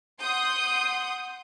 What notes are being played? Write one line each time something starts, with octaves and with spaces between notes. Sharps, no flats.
F#5 C6 D#6 G6